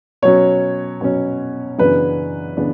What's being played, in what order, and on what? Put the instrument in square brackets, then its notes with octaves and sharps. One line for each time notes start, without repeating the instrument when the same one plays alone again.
[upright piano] B2 F#3 C#4 C#5
B2 F#3 C#4
F#2 C#3 E3 B3 D4 B4
C#3 E3 B3 D4